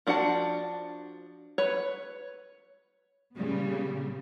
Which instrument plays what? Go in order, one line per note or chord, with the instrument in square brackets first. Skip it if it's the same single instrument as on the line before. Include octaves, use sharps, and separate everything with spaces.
[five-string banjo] F3 D4 F#4 F#5 A5
B4 C#5
[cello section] A#2 C#3 G3 B3